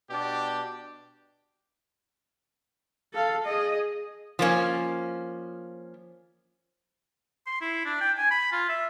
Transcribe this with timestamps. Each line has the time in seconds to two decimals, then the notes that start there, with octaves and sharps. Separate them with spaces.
0.10 B2 D4 G4
3.13 A4 F5
3.45 G#4 D#5
4.39 F3 A#3 C#4
7.47 C6
7.61 E4
7.85 D4
8.01 G5
8.18 G#5
8.31 B5
8.52 F4
8.69 E5